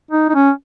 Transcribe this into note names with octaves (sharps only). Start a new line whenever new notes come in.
D#4
D#4
C#4